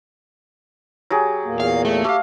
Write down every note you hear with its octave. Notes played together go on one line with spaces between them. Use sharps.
F#3 G4 G#4
E2 A#2 A#3
F5
A3
A3 G4 F5